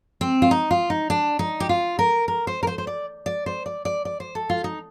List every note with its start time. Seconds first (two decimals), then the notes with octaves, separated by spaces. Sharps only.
0.21 C4
0.42 F4
0.51 D#4
0.71 F4
0.90 D#4
1.10 D4
1.39 D#4
1.60 G4
1.69 F4
1.99 A#4
2.28 A#4
2.47 C5
2.63 A#4
2.67 C5
2.78 C5
2.87 D5
3.26 D5
3.46 C5
3.66 D5
3.85 D5
4.05 D5
4.20 C5
4.35 A4
4.50 F4
4.64 D#4